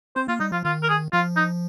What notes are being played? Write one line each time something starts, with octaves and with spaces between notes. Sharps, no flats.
C4 C5
A#3 F4
G3 D#4
F3 F4
D#3 F4
A#4
G#4
F3 F4
D#4